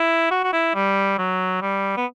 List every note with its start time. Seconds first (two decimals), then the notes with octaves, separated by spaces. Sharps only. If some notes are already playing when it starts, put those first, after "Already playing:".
Already playing: E4
0.31 F#4
0.44 F#4
0.53 E4
0.74 G3
1.18 F#3
1.62 G3
1.97 B3